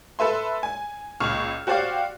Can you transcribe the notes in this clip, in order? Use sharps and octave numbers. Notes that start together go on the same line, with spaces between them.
A4 B4 E5 C6
G#5
C#2 A#2 C#6 F6
F#4 G4 C5 D5 F5